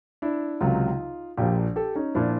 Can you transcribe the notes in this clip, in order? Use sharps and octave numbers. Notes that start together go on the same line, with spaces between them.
D4 E4
C#2 C3 D#3 F#3 D#4 F4
A#1 A#2 F3 F4 G4
G4 A4
C#4 D#4
A#2 F3 D4 E4